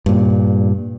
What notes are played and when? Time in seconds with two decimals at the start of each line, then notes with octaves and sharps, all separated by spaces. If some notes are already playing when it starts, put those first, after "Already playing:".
0.06 G2 A#2